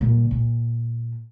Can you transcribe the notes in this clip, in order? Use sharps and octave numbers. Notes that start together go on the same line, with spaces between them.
A#2 G3
A#2